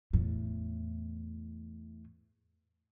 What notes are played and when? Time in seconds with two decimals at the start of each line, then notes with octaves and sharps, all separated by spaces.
0.13 E2 A2